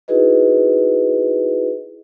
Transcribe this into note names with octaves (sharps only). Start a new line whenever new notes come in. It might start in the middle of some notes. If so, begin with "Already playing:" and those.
D#4 E4 F#4 G#4 B4 D#5